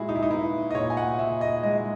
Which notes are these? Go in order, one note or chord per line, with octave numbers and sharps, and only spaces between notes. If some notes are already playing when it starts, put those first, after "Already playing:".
Already playing: A#2 G#3 E4 F#4 G#4
D#4
E4
D#4
B3 E4
D#5
A#2 C#5
G#5
F#5
A#2 E5
D#5
G#3 D#5